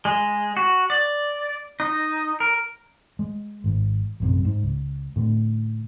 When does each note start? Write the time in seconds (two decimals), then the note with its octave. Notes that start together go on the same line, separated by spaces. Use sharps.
0.05 G#3
0.57 F#4
0.90 D5
1.80 D#4
2.40 A#4
3.19 G#3
3.64 G#1 G#2
4.20 A#1 F#2 C3
4.45 G#2
4.63 C#2
5.16 A2 D3